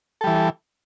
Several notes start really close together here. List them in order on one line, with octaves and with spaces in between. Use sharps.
A4 G3 E3